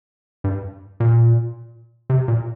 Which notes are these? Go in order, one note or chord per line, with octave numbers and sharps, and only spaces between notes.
G2
A#2
C3
A#2